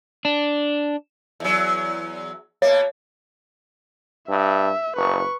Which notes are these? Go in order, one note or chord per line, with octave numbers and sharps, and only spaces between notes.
D4
E2 F#3
B2 A#3 C#5
G2 E5
F#1 B4 C#6